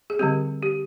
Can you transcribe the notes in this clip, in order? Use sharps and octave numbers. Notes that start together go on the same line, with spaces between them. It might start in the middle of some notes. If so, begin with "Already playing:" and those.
G#4
D3 G3 C4 G4
G4